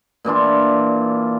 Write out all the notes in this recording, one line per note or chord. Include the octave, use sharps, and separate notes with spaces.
A#2 E3 D4 F4